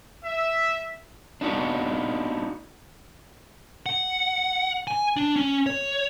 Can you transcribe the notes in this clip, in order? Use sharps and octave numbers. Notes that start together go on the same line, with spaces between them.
E5
D4 D#4 F#4
F#5
G#5
D4
C#4
C#5